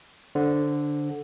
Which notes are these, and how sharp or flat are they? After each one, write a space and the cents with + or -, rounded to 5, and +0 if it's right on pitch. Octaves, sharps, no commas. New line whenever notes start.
D3 +0 C5 +0